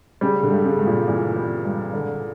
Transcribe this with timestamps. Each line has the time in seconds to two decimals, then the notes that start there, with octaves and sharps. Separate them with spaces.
0.21 C#3 G3
0.43 D3
0.51 G2
0.65 C#3
0.79 G2
0.86 A#2
1.07 A#2 E3
1.36 G3
1.65 G2
1.93 D3